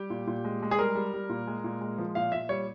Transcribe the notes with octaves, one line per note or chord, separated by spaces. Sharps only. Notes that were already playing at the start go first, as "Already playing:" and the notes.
Already playing: G3 G4
A#2
A#2
G#3
G#3
G#4
G3 A#4
G3
G3
A#2
G#3
A#2
G#3
F3
A#2 F5
A#2 E5
G3 C#5